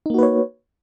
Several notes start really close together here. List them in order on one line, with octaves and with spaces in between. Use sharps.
D#4 A#3 F#4 B4 C#5